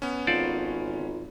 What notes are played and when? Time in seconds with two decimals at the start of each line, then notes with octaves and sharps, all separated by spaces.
0.02 B3 C#4
0.27 G#1 F4 A4 C5 D5